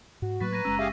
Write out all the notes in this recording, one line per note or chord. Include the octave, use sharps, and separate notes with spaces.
G#2 F#4
A2 F#3 A#3 B4 C#6 A6 B6
A#5 G#6 A#6 D#7
F#1 G#3 C#4 E6 D#7
G4 G#4 E5 F5